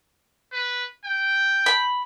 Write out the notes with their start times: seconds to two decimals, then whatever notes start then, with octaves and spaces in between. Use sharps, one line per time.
0.52 B4
1.04 G5
1.66 B5